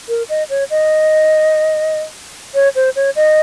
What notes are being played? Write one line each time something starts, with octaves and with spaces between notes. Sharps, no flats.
A#4
D#5
C#5
D#5
C#5
C5
C#5
D#5